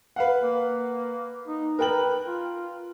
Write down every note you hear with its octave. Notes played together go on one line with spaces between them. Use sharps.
B4 F5 F#5
A#3
D#4
A#4 B4 G5 F#7
F4